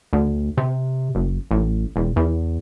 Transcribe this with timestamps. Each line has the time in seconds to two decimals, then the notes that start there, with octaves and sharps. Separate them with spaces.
0.13 D2
0.58 C3
1.15 F#1
1.51 A1
1.96 E1
2.16 E2